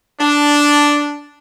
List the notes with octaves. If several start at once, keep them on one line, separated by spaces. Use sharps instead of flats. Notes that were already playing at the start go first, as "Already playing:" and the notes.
D4